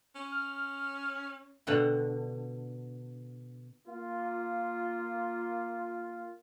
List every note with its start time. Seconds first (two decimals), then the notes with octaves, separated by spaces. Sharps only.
0.15 C#4
0.32 F6
1.67 B2 D3 F#5 G5
3.87 A#3 F4